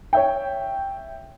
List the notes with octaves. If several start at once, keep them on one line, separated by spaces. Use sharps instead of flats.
C#5 E5 G5